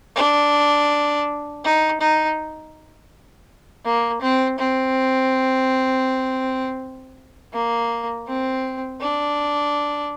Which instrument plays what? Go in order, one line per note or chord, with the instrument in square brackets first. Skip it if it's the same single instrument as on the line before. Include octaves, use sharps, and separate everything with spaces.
[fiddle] D4
D#4
D#4
A#3
C4
C4
A#3
C4
D4